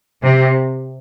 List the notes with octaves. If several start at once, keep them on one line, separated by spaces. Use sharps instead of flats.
C3